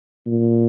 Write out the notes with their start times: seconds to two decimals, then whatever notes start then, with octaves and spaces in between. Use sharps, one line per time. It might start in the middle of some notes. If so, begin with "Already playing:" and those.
0.27 A#2